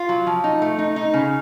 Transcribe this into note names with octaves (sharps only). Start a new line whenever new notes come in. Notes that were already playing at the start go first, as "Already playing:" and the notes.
Already playing: F4
F#3
F3
D#4
A3
D#4
D#4
C#3